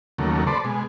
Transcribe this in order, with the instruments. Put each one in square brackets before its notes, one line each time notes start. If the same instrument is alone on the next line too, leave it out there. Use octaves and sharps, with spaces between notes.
[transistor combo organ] D#2 C#3 F#3 A3 A#3
A4 B4 C5 D5
B2 G#3